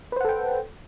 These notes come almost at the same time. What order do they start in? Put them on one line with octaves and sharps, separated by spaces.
B4 C5 F#5 A4 G5